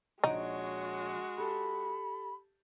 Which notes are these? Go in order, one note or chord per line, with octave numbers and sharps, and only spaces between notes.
A#1 G#3 D#4 F#4 C#5 F#5 D7
G4 A4 A5 B5